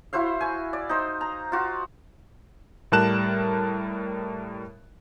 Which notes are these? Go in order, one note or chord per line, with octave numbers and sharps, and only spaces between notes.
E4 F#4 C5 F5
G#5 C#6
D5
D#4 C5
A#5
F4 F#4
A2 G3 A#4 A5 F#6 E7